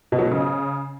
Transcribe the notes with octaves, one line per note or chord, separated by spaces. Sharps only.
B2
F#3
G#2
C#3